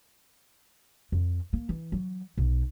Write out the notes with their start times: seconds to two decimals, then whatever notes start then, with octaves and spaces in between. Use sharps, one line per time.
1.12 F2
1.53 A#3
1.69 E3
1.92 F#3
2.37 B1